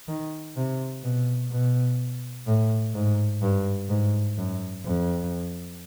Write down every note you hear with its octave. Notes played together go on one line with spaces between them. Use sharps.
D#3
C3
B2
B2
A2
G#2
G2
G#2
F#2
F2